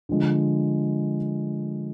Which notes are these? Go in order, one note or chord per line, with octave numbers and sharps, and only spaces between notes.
D3 F3 G#3